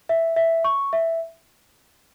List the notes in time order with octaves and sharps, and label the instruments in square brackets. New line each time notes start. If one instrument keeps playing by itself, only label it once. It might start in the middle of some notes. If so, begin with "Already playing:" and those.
[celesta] E5
E5
C#6
E5